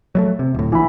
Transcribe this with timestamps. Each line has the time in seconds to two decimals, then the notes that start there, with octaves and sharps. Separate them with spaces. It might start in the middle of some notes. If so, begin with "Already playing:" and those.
0.15 F#3 G3 A3
0.39 C3
0.55 D1 A2
0.72 A#1 E3 B5